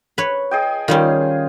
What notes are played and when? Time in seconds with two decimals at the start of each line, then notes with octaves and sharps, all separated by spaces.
0.18 B4 C#5
0.51 G#4 D#5 G5
0.88 D#3 G3 C#4 F4